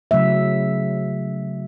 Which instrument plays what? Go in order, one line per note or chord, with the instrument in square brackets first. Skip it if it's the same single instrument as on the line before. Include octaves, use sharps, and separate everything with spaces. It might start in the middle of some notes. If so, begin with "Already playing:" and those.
[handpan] C#3 F#3 A3 E5